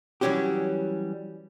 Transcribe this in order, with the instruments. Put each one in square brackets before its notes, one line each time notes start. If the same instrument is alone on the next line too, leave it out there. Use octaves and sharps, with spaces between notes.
[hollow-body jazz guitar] E3 F#3 G3 C#4 F#4 G4